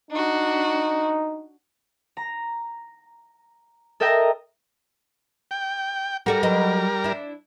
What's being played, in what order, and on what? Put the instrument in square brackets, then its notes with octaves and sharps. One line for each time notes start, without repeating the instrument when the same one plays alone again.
[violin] D4 F#4 [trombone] D#4
[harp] A#5
A4 A#4 D#5 E5 G5 A#5
[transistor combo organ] G5
[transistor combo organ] G3 A#4 [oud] F#4 A4 D5
[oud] F#3 B4 D#5
D4 E4